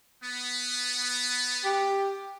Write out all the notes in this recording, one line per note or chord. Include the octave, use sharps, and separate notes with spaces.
B3
G4